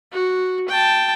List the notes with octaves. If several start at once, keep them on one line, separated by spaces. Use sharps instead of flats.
F#4
G5 A5